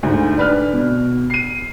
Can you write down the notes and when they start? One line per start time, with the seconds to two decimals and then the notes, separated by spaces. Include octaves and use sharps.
0.03 D2 G#2
0.37 D4 B4 F6
0.74 B2
1.30 C7 D#7